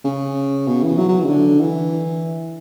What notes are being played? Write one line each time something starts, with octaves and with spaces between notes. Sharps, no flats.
C#3
B2
E3
F#3
F#3
E3
C#3
D3
E3